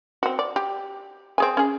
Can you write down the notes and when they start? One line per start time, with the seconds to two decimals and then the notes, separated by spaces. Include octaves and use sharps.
0.23 C4 F#4
0.39 D5
0.56 G4
1.38 C4 G#4 G#5
1.57 C#4 G#4